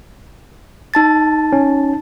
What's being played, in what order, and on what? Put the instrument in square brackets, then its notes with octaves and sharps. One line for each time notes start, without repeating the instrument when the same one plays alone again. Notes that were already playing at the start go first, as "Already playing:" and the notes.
[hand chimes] D#4 A5 A6
[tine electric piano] C#4